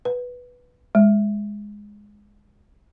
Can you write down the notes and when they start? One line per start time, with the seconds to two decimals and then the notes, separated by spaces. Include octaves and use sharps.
0.05 B4
0.95 G#3